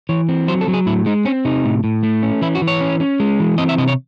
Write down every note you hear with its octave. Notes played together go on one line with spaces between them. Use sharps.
E3 C#5
C4
F#3 C5
A4
F#3
G#4
A2 E4
G#3 D#4
C4 C#4
C3 D#4
A2
A2
A3
C#4
E3 E4
F#4
E3
C#5
C#4
C#4
G#3
E3
C4 D#5
E5
C3 D#5
C#5